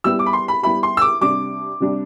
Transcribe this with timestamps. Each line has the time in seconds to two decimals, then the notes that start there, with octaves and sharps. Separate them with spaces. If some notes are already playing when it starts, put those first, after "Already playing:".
0.04 G3 B3 E4 G4 E6
0.19 D6
0.26 B5
0.33 C6
0.48 B5
0.63 G3 B3 E4 G4 B5
0.83 C6
0.97 E6
1.01 D6
1.21 C3 G3 D4 D6
1.80 C3 G3 D4